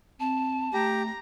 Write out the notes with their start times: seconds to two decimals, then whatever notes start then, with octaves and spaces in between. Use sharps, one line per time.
0.20 C4 A5
0.73 A3 G4 A#5